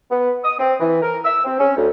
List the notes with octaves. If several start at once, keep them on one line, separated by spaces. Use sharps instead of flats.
B3
D#6
C4
E3
A#4
E6
C4
C#4
D2